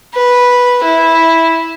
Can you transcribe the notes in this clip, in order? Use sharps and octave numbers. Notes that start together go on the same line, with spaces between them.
B4
E4